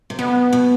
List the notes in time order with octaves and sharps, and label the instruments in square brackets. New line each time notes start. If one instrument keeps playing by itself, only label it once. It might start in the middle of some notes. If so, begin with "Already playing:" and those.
[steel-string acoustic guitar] C3
[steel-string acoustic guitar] B2 [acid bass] B3
[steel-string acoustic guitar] B2